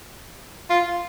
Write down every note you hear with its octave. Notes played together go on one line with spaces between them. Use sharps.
F4